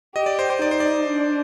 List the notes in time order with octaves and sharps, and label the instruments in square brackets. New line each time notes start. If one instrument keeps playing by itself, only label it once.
[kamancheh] G4 [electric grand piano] D#5
[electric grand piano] D5
C5
C5
[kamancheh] D#4 [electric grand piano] D5
[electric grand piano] C5
D5
[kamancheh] D4